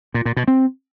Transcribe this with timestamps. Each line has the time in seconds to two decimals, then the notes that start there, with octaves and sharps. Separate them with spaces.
0.14 A#2
0.25 A#2
0.37 B2
0.48 C4